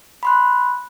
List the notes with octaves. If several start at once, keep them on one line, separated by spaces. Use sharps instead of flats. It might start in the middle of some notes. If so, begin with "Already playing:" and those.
B5 C6 F#6